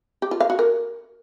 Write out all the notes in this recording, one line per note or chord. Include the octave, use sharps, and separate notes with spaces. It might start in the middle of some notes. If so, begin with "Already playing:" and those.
G4
F4
F5
F#4
A#4